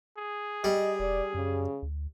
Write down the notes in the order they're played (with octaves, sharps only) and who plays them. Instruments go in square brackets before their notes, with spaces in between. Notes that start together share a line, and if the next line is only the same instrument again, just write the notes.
[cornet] G#4
[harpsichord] G3 [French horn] D#5
[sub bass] E1 [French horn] D5
[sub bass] F#2 [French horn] C#3
[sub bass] D2